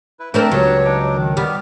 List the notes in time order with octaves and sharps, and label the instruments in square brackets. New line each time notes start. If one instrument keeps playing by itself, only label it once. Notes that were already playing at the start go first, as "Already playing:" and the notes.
[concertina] E4 B4
[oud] E3 C4 A#4 [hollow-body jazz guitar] A3 [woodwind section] D4 [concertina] A5 A#5
[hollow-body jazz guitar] C#2 [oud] F#3 [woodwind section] G4 B4 C#5
[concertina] D4 D#4 D6
[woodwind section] D#3
[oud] G3 [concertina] B3 G4 F6